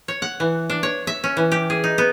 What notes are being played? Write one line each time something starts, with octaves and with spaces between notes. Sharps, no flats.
C#5
F#5
E3
D4
C#5
E5
C#4
E3
G4
G#4
D#4
B3